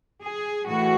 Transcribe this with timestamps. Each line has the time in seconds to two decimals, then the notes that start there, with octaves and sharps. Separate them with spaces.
0.23 G#4
0.66 A2 E3 F#4